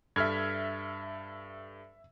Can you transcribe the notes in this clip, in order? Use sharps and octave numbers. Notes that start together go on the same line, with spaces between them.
G2 A4 E5 F6 G#6